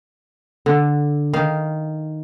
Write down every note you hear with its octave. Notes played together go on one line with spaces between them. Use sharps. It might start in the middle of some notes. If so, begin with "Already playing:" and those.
D3
D#3 F5